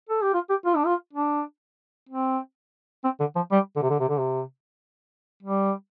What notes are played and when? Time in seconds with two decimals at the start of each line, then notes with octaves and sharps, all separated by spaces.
0.09 A4
0.22 G4
0.34 F4
0.49 G4
0.66 F4
0.76 D4
0.86 F4
1.13 D4
2.09 C4
3.04 C4
3.19 D3
3.36 F3
3.51 G3
3.76 D3
3.82 C3
3.90 D3
4.00 C3
4.09 D3
4.18 C3
5.43 G3